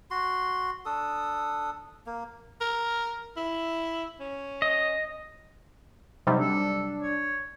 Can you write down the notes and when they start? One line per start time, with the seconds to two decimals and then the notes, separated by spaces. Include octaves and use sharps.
0.11 F#4 C6
0.86 D4 A4 D#6
2.06 A#3
2.61 A#4
3.37 E4
4.20 C#4
4.62 D#5
6.27 C3 F#3 G3 D#4
6.39 D4 A4
7.02 C#5